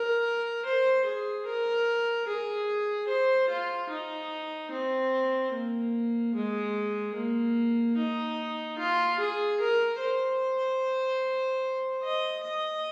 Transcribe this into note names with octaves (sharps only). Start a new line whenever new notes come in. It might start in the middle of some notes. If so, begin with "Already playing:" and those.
Already playing: A#4
C5
G#4
A#4
G#4
C5
F4
D#4
C4
A#3
G#3
A#3
D#4
F4
G#4
A#4
C5
D#5
D#5